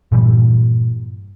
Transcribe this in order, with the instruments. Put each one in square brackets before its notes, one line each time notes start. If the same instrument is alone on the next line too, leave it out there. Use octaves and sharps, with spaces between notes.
[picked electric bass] G2 A#2 E3 G3